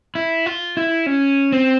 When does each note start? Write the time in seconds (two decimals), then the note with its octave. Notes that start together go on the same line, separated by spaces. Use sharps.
0.15 E4
0.46 F4
0.77 E4
1.06 C#4
1.52 C4